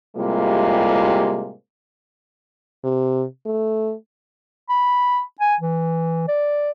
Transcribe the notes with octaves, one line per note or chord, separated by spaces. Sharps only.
A2 C3 G3 G#3 A#3 F4
C3
A3
B5
G#5
E3
D5